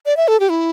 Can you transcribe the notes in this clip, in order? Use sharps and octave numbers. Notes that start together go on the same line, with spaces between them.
D5
E5
A4
G4
E4